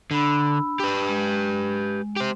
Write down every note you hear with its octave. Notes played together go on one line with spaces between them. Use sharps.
D3 D4 B5 E6
G4 B4
G#3
G4 C5